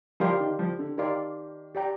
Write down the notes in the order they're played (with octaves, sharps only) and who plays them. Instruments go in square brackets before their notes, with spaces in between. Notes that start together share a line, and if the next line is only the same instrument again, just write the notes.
[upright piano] F3 [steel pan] G4 A#4 D5 F5 C6
[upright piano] D#3
F3
D3
[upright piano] D#3 [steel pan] G4 A#4 D5 F5 C6
[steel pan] G4 D5 G5 A#5